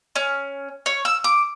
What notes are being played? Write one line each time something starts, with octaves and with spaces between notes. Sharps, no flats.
C#4
C#5
E6
D6